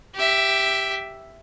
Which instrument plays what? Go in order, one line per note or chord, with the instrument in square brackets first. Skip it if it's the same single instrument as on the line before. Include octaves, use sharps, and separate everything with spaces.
[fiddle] G4 E5